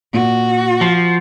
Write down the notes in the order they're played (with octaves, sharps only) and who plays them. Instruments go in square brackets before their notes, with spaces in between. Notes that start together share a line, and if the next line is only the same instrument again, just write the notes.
[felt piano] A#2 [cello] F#4
[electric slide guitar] F3 [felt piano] C7